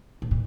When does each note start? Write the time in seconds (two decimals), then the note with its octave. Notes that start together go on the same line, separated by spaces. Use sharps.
0.22 A2
0.31 A#2